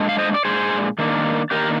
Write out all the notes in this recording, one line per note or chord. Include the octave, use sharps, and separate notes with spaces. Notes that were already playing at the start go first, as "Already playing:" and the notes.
Already playing: A#2 G#3 D4
F5
C5 D#5
D5
A#2 G#3 D4 G#4 C5
D#3 A#3 D4
D#3 A#3 D4 G4 A#4